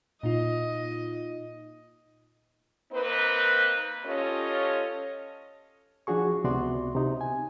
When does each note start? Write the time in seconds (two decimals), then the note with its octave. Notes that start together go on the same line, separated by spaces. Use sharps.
0.23 A#2 D#4 F4 D#5
2.92 A#3 C4 D#4 B4
4.06 C#4 F4 G4 A4 C#5 D#5
6.07 F3 D4 F#4 G#4 C#6
6.44 C#2 C3 B3 F#4 D5 C6
6.95 C3 D#4
7.21 G#5